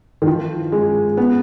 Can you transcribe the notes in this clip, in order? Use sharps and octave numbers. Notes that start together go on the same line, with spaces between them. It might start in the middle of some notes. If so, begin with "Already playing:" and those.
D#3
F3
G#3
B3